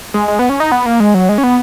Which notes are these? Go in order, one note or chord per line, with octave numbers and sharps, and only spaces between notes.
G#3
G#3
B3
C#4
D#4
B3
A#3
G#3
F#3
G#3
C#4
B3